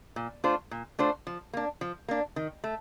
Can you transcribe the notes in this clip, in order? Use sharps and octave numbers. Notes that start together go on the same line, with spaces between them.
A#2
A3 D4 F4 C5
A#2
A3 D4 F4 C5
F3
A#3 D4
F3
A#3 D4
D#3
A3